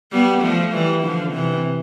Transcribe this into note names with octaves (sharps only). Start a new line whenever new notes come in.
G3 B3
F3 A3
E3 G3
D3 F3
C3 E3